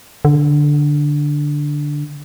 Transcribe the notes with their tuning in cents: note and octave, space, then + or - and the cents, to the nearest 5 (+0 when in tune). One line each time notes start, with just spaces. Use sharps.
D3 +0